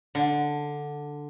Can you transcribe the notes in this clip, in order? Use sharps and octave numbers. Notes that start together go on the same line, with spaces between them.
D3